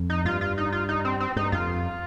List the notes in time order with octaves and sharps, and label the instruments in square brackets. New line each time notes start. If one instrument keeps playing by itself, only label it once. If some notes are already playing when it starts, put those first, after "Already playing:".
Already playing: [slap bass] F2
[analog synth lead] D#4
[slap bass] G2 [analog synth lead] F4
[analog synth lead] F4
D#4
F4
D#4
C4
C4
[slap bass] G2 [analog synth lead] D#4
[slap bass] F2 [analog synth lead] F4